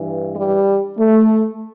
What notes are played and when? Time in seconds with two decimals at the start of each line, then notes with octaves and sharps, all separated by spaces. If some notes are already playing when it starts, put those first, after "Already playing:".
Already playing: G2 E3
0.35 G3
0.98 A3